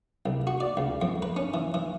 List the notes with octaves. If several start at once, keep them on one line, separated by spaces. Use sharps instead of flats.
C2
F#4
D5
C#2
F2
B4
C#4
E3
E3